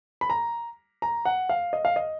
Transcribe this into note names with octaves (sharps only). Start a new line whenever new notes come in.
B5
A#5
A#5
F#5
F5
D#5
F5
D#5